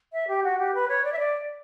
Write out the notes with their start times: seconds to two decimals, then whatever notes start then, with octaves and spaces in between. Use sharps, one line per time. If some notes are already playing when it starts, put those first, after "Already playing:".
0.12 E5
0.27 G4
0.43 F#4
0.58 G4
0.74 B4
0.88 C#5
1.03 D5
1.12 E5
1.18 D5